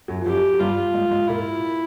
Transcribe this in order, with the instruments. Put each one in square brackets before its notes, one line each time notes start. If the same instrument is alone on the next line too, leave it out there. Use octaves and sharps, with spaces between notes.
[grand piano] F#2 F#3
F3
[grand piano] F#2 F#3 [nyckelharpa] G4
[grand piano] F#3
[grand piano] G2 G3 [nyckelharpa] F4
[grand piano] G#2 G#3
G#2 G#3
[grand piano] A#2 A#3 [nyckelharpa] E4